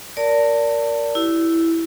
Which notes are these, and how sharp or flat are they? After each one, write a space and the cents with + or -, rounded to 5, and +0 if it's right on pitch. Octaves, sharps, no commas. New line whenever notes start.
A#4 +0 D5 -20 A5 +30
E4 +0 G4 -25